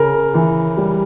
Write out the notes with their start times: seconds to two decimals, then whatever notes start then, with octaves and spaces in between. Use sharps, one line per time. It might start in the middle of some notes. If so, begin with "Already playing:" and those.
Already playing: C#3 A#4
0.34 E3
0.77 G3